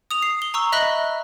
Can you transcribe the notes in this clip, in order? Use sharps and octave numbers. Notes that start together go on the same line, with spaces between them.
D#6 F7
C7
G7
A#5 C#6 E6
D#5 E5 B5 F#6 A#6 G7